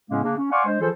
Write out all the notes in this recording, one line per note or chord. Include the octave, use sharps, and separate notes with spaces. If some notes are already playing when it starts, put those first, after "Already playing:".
A2 C#3 G#3 A#3 B3 C#4
C#3 A#3 D4
C#4
D5 F5 F#5 G#5 C6 C#6
G#3 D4 C5
E3 F3 F4 G#4 A4 C5